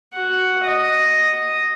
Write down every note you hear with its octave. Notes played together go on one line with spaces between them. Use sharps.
F#4 F#5
D#5